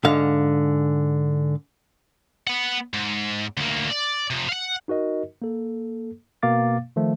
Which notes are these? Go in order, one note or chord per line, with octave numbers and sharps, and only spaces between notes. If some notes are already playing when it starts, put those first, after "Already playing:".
G#2 D3 F5
B3 F#5
G#2
D2 A#3
D5
C3 F3
F5 F#5
D#4 F#4 A#4 D#5
A#3 A4
B2 A#3 F5 D6 A6
D#3 F3 A3